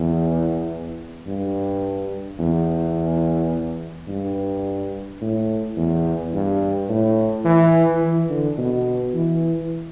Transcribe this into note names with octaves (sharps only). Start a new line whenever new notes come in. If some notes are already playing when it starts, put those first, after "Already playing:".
Already playing: E2
G2
E2
G2
A2
E2
G2
A2
E3
E3
D3
B2
E3